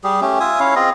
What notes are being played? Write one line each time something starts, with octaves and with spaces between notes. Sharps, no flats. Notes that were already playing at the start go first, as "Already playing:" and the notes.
G3 G4 G#4
A3 C#4 G4
F4 E5 G#5 D#6
C#4 E4 C#5 F5
C4 F4 G#4 D#5